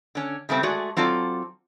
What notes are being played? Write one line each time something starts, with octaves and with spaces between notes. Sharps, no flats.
D3 C#4
C#3 G3 A3 C4
G#3 A3 F#4 G#4 D5
F#3 C4 F4 A4 D5